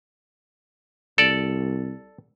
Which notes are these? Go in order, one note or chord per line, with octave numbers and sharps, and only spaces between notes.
C2 A4 D5